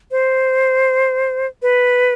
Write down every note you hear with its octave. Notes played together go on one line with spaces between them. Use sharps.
C5
B4